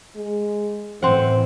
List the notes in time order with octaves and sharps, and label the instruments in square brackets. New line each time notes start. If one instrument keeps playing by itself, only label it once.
[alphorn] G#3
[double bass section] A2 E3 [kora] C4 F#5 [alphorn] C5